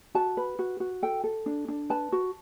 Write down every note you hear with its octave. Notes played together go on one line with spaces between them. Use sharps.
F#4 A5
B4
F#4
F#4
A4 G5
A4
D4
D4
B4 A5
F#4